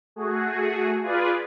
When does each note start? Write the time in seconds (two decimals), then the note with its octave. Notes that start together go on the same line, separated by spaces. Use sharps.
0.16 A3 F#4 G#4
1.02 F4 G#4 B4 D5